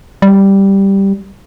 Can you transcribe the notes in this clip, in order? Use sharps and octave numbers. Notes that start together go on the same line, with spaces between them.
G3